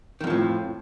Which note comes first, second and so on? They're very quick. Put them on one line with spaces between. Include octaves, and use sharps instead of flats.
D#3 F2 F3 A2